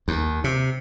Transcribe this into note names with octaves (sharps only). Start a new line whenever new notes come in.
D#2
C3